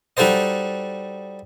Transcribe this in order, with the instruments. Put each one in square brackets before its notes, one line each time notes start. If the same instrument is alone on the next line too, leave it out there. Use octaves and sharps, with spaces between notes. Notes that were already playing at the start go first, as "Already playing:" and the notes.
[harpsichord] G3 D#4 F#4 A4 C5 D#5